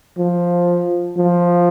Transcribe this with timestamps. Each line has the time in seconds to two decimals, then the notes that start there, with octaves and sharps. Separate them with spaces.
0.18 F3
1.17 F3